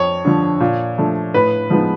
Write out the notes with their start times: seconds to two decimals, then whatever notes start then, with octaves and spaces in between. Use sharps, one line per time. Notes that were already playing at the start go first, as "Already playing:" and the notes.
Already playing: F2 C#5
0.25 D3 F3
0.60 A#2
0.98 F3 A3 D4
1.34 A2 B4
1.70 F3 G#3 B3 D#4